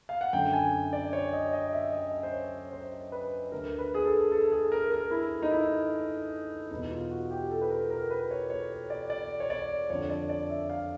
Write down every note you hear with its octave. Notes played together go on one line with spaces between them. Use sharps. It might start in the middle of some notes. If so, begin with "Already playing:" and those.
F5
F#5
F#2 D3 G5
G#5
D5
C#5
D#5
D#5
E5
D#5
C5
C#5
C5
B4
D2 D3 A#4
B4
G#4
A4
A4
G#4
A#4
A#4
E4
D#4
E4
E2 B2 D#4
F4
F#4
G4
A4
B4
A#4
A#4
B4
C#5
C#5
D5
D5
C#5
D5
F2 D3 C#5
D5
D5
E5
F5